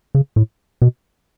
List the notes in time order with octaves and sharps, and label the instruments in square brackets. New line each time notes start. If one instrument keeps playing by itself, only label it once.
[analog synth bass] C#3
A2
B2